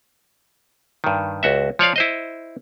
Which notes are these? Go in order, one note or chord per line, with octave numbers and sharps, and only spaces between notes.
G2 D#3
C#2 F#4 E5
F3 C#5 D5 F5
E4 C5 D#5